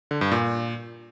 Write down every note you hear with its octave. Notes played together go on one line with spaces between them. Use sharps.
D3
G2
A#2